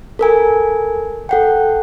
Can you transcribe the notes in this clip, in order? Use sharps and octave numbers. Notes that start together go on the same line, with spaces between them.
A4 A#4 G#5
A4 F#5 G5